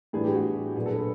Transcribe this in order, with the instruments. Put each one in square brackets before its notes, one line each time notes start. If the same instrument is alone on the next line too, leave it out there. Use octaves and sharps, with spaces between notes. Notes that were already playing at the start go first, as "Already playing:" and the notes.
[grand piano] A2 E3 G3 B3 D4 G#4
G4
F#4
A#2 F#3 B3 D4 G#4
A4
B4